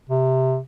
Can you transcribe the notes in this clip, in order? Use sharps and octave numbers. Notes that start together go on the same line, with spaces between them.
C3